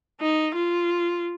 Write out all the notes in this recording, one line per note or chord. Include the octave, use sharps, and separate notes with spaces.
D#4
F4